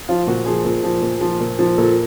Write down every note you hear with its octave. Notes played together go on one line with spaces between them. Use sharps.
F3 F4
A#2 F#4
F3 G#4
A#2
F3
A#2
F3
A#2
F3
A#2 A4